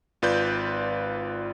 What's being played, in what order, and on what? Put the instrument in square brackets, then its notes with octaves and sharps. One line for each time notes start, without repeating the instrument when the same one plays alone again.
[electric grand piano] G#1 F4 B4 D5 G6